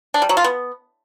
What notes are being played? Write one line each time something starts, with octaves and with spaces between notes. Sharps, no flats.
D4
G3
F#3
F4
B3